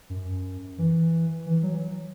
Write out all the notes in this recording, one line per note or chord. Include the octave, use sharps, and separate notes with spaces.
F#2
E3
E3
F#3